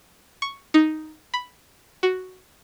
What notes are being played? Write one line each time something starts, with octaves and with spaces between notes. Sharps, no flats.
C#6
D#4
B5
F#4